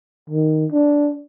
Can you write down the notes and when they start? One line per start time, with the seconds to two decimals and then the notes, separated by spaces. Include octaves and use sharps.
0.30 D#3
0.72 D4